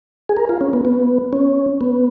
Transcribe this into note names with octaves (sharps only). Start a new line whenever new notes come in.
G#4
A#4
F4
C#4
B3
B3
C#4
B3